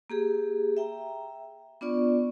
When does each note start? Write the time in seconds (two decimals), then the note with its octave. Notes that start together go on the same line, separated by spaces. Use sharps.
0.10 A#3 G4 G#4
0.77 E5 G5 A#5
1.81 B3 D4 F4 D5 C#6